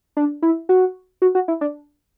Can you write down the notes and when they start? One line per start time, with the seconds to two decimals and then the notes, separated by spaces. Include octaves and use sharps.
0.17 D4
0.42 E4
0.69 F#4
1.22 F#4
1.35 F#4
1.48 E4
1.61 D4